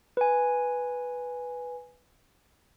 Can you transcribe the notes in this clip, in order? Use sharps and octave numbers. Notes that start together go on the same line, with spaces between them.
B4 G#5